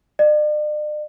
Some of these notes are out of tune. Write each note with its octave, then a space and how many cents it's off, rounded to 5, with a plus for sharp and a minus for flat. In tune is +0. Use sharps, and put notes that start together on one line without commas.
D5 +45